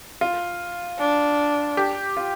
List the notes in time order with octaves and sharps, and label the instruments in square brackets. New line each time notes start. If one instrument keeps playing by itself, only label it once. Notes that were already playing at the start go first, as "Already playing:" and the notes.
[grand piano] F4
[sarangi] D4
[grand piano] G4
F4